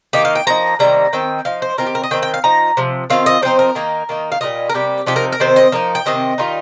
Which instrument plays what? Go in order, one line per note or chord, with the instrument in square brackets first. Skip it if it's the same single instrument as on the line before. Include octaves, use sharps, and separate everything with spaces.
[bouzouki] D#3 A#3 D#4 G4
F5
G5
F3 A#3 D#4 A#5
C3 D#3 G3 A#3 A#5
D#3 C4 D#4 G5
F3 D#4 F5
C5
D#3 C4 F4 A#4
G4
A#4
D#5
D#3 C4 D#4 G5
G5
F5
F3 D#4 A#5
C3 F3
D#3 C4 F4 F5
D#5
F3 C4 D#4 C5
A#4
D#3 A#3 D#4
D#3 A#3 D#4
F5
A#2 G3 A#3 F4 D#5
A#4
C3 G3 A#3 G4
C3 F3 D#4 G4
A#4
A#4
C3 D#3 C4 C5
D#5
F3 A#3 D#4
G5
C3 D#3 C4 D#5
D#3 G3 D#4 F4